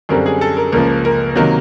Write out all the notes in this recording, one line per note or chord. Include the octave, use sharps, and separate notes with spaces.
F#2 D3 G3 C4 A#4
G#4
A4
A#4
C#2 C#3 F3 A#3 A#4
A#4
C3 D#3 F#3 A#3